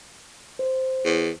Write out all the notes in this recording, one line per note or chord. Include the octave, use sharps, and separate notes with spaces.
C5
E2